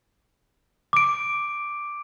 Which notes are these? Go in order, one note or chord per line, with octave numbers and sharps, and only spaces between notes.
D6 D7